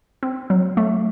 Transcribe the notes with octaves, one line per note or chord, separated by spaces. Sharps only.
C4
F#3
A3